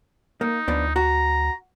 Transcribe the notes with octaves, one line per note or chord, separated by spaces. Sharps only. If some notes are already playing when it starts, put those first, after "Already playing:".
A#3 D#4
D2 F3 B3 D4
F#4 A#5